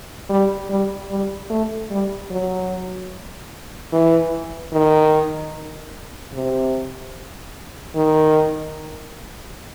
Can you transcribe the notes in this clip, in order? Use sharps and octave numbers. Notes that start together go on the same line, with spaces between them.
G3
G3
G3
A3
G3
F#3
E3
D#3
C3
D#3